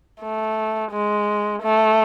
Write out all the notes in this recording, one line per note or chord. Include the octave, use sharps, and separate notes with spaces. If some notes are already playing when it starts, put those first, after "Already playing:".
A3
G#3
A3